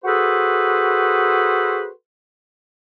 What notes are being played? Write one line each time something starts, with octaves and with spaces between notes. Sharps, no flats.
F#4 G#4 A4 B4 C5